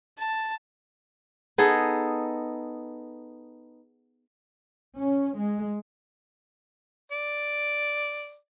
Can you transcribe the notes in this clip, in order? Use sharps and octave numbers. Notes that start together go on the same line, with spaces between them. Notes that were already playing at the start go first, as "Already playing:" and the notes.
A5
B3 D#4 G#4 A4
C#4
G#3
D5